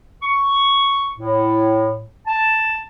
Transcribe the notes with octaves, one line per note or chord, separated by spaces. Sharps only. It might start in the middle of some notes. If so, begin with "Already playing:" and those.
C#6
A2
A5